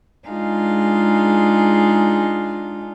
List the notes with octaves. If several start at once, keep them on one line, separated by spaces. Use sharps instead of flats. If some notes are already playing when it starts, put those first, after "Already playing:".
G#3 D4 D#4 F4 G#4 F5